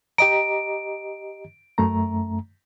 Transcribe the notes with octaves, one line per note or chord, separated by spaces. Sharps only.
G4 D#5 A#5 D7
F#2 A3 A#5